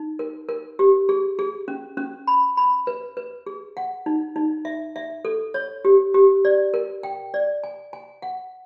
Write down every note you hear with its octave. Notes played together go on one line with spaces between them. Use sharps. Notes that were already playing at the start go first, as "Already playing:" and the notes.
Already playing: D#4
A#4
A#4
G4
G#4
G#4
C#4
C#4
B5
B5
B4
B4
G#4
F#5
D#4
D#4
E5
E5
A4
C#5
G4
G4
D5
A#4
G5
D5
G#5
G#5
F#5